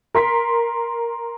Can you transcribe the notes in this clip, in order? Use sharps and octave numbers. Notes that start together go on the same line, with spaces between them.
A#4 C6 B6